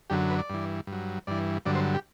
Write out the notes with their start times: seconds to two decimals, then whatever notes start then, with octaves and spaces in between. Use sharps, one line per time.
0.10 F#2 D3 F#3 G4
0.30 B4
0.39 D5
0.50 G2 E3
0.87 G2 F#3
1.27 G2 E3 D5
1.66 G2 D3 F#3 D5
1.75 C5
1.94 G4